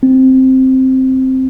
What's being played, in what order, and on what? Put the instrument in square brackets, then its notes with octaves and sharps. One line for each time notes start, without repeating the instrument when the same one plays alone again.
[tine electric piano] C4